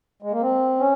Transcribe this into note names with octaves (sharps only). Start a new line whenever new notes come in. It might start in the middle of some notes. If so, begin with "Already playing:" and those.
G#3
A#3
C4
C#4